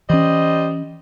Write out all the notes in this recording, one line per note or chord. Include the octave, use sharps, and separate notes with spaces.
E3 G3 C#4 C5 D#5